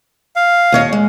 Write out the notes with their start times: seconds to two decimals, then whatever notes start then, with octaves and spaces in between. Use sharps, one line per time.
0.36 F5
0.72 D#2 C#5 D#5
0.93 G#3